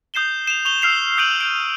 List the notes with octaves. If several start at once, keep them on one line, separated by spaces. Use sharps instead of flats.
D#6 G6 C7 E7 G7
E7 F7
C#6 F7 G7
E6 F6 C7 F7
D#6 G6 C7 D7 D#7 F#7
G6 D7